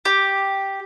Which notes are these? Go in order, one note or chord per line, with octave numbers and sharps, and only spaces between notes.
G4